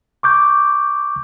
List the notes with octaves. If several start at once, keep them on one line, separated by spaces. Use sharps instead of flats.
C#6 D6 G6